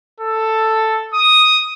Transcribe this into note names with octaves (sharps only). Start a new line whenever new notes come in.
A4
D#6